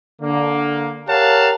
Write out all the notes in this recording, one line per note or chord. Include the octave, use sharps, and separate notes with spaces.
D3 A#3
G4 A#4 C#5 F5 F#5 A5